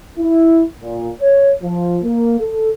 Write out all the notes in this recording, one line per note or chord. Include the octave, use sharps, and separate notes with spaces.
E4
A#2
C#5
F3
A#3
A4